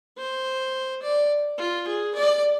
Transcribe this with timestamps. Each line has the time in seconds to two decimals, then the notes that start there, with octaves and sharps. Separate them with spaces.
0.18 C5
1.03 D5
1.58 F4
1.88 G#4
2.15 D5